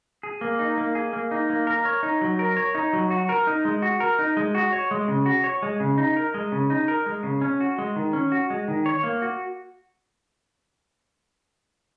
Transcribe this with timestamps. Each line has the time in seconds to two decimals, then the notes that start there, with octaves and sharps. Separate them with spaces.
0.23 G#4
0.41 A#3
0.59 D#4
0.77 A#3
0.95 G#4
1.13 A#3
1.31 D#4
1.50 A#3
1.67 A#4
1.85 C#5
2.03 D#4
2.21 F#3
2.39 A#4
2.57 C#5
2.75 D#4
2.93 F#3
3.10 F#4
3.29 A#4
3.47 D#4
3.65 G#3
3.82 F#4
4.00 A#4
4.19 D#4
4.37 G#3
4.55 F#4
4.73 C#5
4.91 G#3
5.08 C#3
5.26 F#4
5.44 C#5
5.63 G#3
5.80 C#3
5.98 D#4
6.16 A#4
6.34 G#3
6.52 C#3
6.70 D#4
6.88 A#4
7.06 G#3
7.23 C#3
7.42 C#4
7.60 F#4
7.78 G#3
7.96 D#3
8.13 C#4
8.32 F#4
8.50 G#3
8.68 D#3
8.86 C#5
9.03 A#3
9.22 F#4